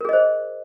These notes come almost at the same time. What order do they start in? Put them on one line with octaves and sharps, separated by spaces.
A#4 G#4 D#5 C5